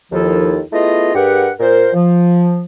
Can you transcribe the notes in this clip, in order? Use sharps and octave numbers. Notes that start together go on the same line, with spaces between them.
D#2 D#3 F3 E4 F4 A4
A3 B3 E4 F4 G#4 D#5
G2 G4 G#4 A#4 B4 F#5
A#2 A#4 C5
F3